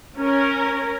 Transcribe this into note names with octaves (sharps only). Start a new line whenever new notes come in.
C#4 A#4